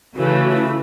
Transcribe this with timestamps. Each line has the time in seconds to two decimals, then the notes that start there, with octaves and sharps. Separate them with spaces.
0.16 C#3 E3 A3 F#4
0.50 F4
0.55 E4